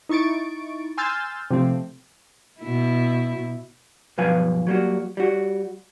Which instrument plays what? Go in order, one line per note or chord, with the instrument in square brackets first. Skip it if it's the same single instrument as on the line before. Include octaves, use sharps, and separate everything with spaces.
[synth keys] D#4 E4 C#6 A6 D7
G#5 C6 E6 F6 G6 A6
C3 F3 A3 C4
[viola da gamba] B2 E4
[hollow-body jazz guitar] B1 G2 F3 B4 F5 G#5
F#3 G3 A#3 F#4
G3 F#4